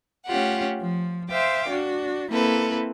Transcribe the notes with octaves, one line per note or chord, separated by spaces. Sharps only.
A3 C#4 F4 G4 F#5
F3
C5 E5 F5 G5 D6
D4 F#4
A#3 C4 E4 A4 B4